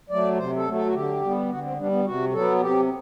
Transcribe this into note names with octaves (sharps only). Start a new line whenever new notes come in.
F#3 A3 D5
C3 C5
A4
F#3 A3
A4
F#4
D3 G4
G3 B3
D3 F#4
C4
G3 B3 D4
B3
C3 F#4
F#3 B3 A4
C3 G4